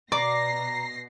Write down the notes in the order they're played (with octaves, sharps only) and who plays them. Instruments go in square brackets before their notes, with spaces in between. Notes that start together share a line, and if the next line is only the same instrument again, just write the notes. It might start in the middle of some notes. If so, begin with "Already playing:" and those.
[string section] B2 A#6 C7 [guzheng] D5 [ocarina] A#5 [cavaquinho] D6